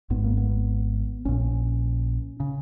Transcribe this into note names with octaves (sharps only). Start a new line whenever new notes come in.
G#1 G#2 B3
A#3
B3
A#1 A#2 C#4
C#3